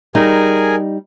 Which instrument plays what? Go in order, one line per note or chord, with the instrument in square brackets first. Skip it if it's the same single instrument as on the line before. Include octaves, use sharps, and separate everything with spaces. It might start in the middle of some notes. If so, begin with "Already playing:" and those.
[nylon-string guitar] G3 D#4 [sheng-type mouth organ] G#4 A#4 G#5